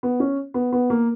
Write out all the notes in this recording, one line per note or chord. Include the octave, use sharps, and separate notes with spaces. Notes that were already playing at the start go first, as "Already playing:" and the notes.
B3
C#4
B3
B3
A#3